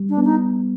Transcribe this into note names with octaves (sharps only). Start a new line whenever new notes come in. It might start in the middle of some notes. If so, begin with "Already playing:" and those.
Already playing: G3
D4
B3
D#4